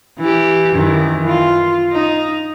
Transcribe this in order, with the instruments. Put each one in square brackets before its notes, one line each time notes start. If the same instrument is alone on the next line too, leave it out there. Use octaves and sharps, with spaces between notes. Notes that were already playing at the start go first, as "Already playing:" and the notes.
[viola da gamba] E3 G4
F#2 D#3 E3
F4
D#4